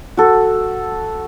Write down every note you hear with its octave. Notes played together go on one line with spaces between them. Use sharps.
F#4 A4